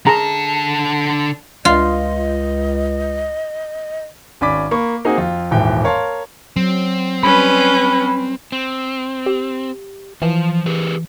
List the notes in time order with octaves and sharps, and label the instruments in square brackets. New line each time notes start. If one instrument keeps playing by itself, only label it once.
[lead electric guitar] D3 A5 [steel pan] G#4 A#5 C6
[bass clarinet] C#2 [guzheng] F4 [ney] D#5
[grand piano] G#1 C#4 D5 B5 D6 B6
A#3 B5 C#6
A#3 C4 D#4 F#4 G#4
F2 F4
D#1 G#2 E3 G5
A#4 C#5 F5 A5 C6
[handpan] F#3 [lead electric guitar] C4
[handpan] G3 [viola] C#4 B4 [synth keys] B5
[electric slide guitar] C4
[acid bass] G4
[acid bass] E3 [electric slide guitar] F3 C5
[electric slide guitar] G4 G#4 B4